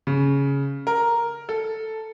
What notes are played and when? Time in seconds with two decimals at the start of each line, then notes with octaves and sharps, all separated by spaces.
0.07 C#3
0.87 A#4
1.49 A4